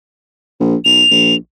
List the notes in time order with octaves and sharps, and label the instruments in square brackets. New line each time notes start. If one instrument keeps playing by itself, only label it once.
[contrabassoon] A#1
[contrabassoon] B1 [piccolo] F7
[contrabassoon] A#1